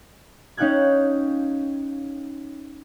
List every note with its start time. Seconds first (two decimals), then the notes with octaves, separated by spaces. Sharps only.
0.57 C#4 D#4 F5 G5 F#6 G#6